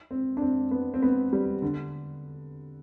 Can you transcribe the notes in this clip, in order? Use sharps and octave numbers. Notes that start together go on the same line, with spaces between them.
C4
D4
C4
B3
C4
B3
G3
D3